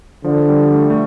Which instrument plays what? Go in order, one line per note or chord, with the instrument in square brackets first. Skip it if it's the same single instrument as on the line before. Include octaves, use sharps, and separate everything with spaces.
[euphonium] D3 [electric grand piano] F3
[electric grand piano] G3
A3
A3